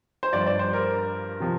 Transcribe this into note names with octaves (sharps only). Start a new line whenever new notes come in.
C5
G2 F3 D5
D5
C5
A#4
C3 F3